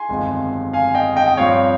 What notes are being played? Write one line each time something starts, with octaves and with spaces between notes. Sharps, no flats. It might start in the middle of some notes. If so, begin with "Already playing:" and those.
Already playing: G#5 C6
G1 F2 D#3 G#3
F5 G#5
D#5 G5
D#5 G5
G5
G2 F3 C4 C#5 F5